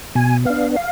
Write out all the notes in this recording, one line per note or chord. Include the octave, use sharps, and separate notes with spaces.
B2 G#5
B3 D4 F5
F5